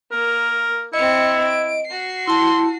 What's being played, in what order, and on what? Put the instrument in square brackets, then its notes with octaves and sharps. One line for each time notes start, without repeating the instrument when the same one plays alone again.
[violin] A#3 [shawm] A#4
[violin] C4 C#7 [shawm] E4 [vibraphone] D#5
[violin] D7
F#4 C7
[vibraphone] E4 A5 [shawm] C6